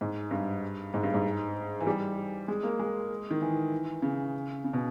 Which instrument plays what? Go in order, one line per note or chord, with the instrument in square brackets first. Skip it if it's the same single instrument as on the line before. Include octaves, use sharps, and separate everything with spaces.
[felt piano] G#2
G2
G#2
G2
G#2
E3
G3
G#3
A#3
G#3
D#3
E3
C#3
C#3
B2